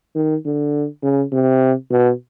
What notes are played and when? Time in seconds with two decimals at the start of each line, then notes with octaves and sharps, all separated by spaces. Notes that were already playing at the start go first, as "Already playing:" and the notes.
0.15 D#3
0.45 D3
1.03 C#3
1.32 C3
1.91 B2